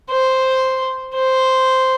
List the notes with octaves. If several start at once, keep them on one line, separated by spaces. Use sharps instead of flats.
C5
C5